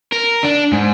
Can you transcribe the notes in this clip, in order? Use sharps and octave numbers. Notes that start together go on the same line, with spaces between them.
A#4
D4
G#2